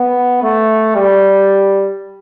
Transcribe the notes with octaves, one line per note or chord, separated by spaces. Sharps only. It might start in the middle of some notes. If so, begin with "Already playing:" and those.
Already playing: B3
A3
G3